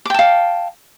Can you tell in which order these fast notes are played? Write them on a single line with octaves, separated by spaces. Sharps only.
D6 G5 A5 F5